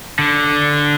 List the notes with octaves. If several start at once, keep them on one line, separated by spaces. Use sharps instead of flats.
D3